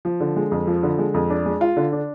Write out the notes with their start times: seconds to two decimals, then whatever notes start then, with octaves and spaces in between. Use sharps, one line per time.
0.05 F3
0.20 D3
0.36 G#3
0.52 F2
0.67 F3
0.83 D3
0.99 G#3
1.14 F2
1.30 D4
1.46 G#3
1.61 F4
1.77 D3
1.92 D4